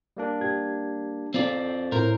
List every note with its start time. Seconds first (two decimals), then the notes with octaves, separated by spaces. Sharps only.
0.17 G3 A#3 D4
0.40 G4 G#6
1.34 C4 F4 D5
1.92 A2 C4 E4 A#4 C5